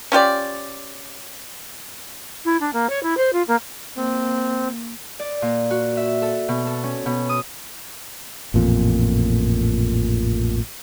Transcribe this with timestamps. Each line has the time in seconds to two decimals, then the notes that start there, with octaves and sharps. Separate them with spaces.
0.12 C#4 F4 G4 D5
2.45 E4
2.60 D4
2.73 A#3
2.89 C#5
3.03 E4
3.17 C5
3.32 F4
3.47 A#3
3.97 A#3 C4
5.20 D5
5.42 A#2
5.71 F#4
5.97 E5
6.22 A4
6.49 B2
6.67 A4
6.84 C#4
7.06 B2
7.29 D#6
8.54 A1 F2 A#2